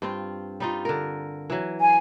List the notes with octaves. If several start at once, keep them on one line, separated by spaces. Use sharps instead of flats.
G2 C4 F4
G3 D#4 F4
D3 A#4
E3 F#3
G#5